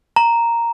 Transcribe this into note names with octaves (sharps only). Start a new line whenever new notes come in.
A#5